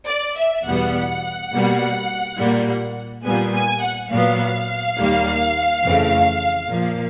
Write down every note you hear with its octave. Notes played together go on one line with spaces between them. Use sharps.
D5
E5
E2 B2 G3 B3 F#5
B2 G3 A#3
A#2 G3 A#3
A#2 G3 B3 G#5
G#5
F#5
A#2 F#3 B3 F5
D#2 D#3 G3 A#3
F2 C#3 E3 A3
A#2 F3 A#3